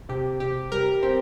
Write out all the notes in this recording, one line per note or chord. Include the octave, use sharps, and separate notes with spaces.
C3 G4
C3 G4
G3 A#4
C4 G4